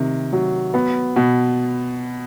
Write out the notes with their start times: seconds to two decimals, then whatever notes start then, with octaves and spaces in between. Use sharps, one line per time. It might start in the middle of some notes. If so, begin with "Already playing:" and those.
Already playing: C3 D#3
0.33 F#3
0.74 B3
1.16 B2